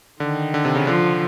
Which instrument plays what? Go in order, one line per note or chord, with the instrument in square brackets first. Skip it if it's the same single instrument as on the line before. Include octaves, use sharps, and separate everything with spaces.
[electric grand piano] D3 [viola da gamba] D#3
[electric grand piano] D3
C3
C#3
[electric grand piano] D3 [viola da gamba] F3